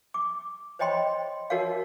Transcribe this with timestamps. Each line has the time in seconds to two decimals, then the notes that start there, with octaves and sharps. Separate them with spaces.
0.14 D6
0.79 C5 C#5 D#5 G5 B5 C6
1.50 D#4 F#4 A#4 C#5 F5